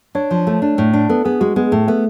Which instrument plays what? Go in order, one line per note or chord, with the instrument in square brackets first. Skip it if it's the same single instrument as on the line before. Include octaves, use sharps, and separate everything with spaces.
[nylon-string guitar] D4 [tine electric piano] C#5
[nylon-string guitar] F3
A3
D4
A2
D4
[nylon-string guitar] B3 [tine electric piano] A4
[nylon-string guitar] B3 [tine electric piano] G#4
[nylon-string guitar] G#3 [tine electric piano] F#4
[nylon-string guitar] G#3 [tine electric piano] B3
[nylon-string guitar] A2 [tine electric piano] A3
[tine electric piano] A3 [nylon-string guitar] B3